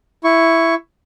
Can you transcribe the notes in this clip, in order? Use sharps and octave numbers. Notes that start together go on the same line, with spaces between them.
E4 C#6